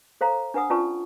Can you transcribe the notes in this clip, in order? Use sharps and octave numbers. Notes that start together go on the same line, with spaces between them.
A4 C5 F5 A#5
D4 B4 F#5 D#6
C#4 F4 B4 D5 A5 C#6